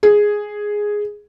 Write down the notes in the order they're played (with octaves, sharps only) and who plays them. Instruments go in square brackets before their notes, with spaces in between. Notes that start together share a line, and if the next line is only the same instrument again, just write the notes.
[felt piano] G#4